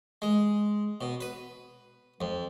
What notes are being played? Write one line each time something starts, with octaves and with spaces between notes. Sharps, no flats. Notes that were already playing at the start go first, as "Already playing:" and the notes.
G#3
B2
B4
F2